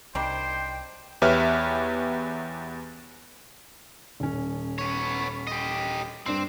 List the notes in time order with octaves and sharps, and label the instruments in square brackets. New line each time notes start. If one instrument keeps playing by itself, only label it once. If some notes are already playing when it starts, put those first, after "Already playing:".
[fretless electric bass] C2 [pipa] D#3 G3 D4 [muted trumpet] C5 [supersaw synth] G5
[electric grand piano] E2 G4 B4 C#5 E5 F6
[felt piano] D#1 C#4
[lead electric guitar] B3 C#5
G4 D#5
[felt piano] G2 D4 C7 [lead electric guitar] C4